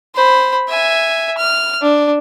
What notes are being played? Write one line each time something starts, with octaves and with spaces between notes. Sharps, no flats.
C5 B5
E5 G#5
F6
D4